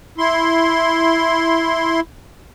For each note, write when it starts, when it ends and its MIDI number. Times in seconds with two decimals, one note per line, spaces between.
0.18 2.00 64
0.18 2.00 84